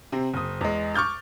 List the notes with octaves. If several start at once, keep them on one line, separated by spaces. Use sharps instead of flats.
C3 C4
F#1 D#6
E2 G#3
C#6 D6 F6 G6 A6